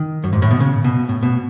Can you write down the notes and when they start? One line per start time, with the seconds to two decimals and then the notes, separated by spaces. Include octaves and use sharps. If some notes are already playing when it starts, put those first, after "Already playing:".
Already playing: D#3
0.24 F#2
0.33 G#2
0.42 A2
0.51 B2
0.60 C#3
0.84 B2
1.09 A2
1.23 B2